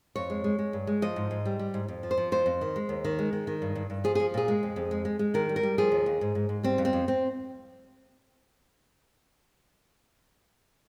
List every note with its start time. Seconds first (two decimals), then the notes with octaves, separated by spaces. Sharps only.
0.16 F2 C#5
0.30 G#3
0.44 G#3
0.59 G#3
0.73 G2
0.87 G#3
1.02 F3 D#5
1.16 G#2
1.31 G#2
1.45 G3
1.59 G3
1.74 G#2
1.88 F2
2.03 F3
2.11 C5
2.17 F3
2.32 F2 C5
2.46 F2
2.61 D#3
2.76 G#3
2.89 D#2
3.05 D#3
3.19 G#3
3.33 D#3
3.47 D#3
3.62 G2
3.75 G2
3.90 G2
4.04 F3 G#4
4.15 F3 G#4
4.34 A#2 G#4
4.48 G#3
4.63 F2
4.76 F2
4.91 G#3
5.05 G#3
5.19 G#3
5.34 D#3 A#4
5.49 G3
5.56 A#4
5.63 G3
5.78 F3 G#4
5.92 D#2
6.06 D#2
6.21 G#2
6.35 G#2
6.49 G#2
6.63 G3 C4
6.78 F2
6.85 C4
6.93 F2
7.08 C4